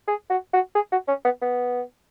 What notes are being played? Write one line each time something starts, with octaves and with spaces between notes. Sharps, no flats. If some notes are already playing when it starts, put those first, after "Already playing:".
G#4
F#4
F#4
G#4
F#4
C#4
B3
B3